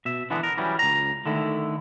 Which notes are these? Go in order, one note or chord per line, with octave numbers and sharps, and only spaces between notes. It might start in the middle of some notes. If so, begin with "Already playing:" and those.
B2 E5
D3 E3 G#3 B3 D4
A#4
E3 F#3 G3 C#4
C#2 A#5
D3 D#3 A3 E4